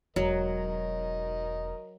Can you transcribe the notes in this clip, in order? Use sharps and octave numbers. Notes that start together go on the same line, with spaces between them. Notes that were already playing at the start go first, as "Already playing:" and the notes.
E1 F#3 A#4 D#5